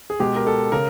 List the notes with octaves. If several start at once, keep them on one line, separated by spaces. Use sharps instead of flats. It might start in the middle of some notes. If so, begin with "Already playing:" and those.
G#4
B2 G#3 G4
A#4
A4
C#3 A#4